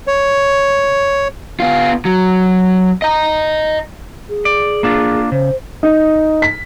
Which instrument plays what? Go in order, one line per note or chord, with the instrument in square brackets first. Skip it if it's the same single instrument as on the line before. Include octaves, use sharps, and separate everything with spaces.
[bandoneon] C#5
[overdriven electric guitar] B3 F4
F#3
D#5 A#5
[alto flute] G#4
[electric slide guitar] D5
A#3 D4 F4
[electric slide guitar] C#3 [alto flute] C5
[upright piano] D#4
B6